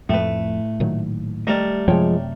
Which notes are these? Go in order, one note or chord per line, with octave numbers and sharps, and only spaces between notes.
F2 A2 A3 B4
A#2 D#3 F#3
G3 A3 A#4 D5 D#5
F#2 C3 F3 G#3 C#5 G5